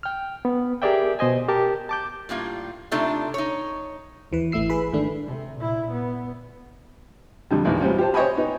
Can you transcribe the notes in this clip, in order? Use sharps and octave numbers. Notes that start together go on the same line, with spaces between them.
G5 F6
B3
G4 G#4 A#4 D5 E5 G5
B2 C5 D#5 G#5
G4 A#4 A5
A5 D6 G6
A2 G3 A#3 F4
C3 A3 D4 D#4 F4 A4
D#4 C#5
D#2 E3 B4
G#1 E3 A3 E4 E6 C7
G#4 B4 B5
G#2 D#3 A3 D4
C3
A#2 E4
B3
F2 D3 G3
G#1 E2 A2
F#3 G3 C4 C#4 F4
G4 C5 A5
C5 C#5 D#5 G5 G#5 B5
B3 D#4